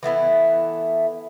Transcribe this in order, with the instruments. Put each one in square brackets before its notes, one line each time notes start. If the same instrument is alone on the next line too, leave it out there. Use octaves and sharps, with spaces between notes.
[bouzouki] E3 A3 B3 E4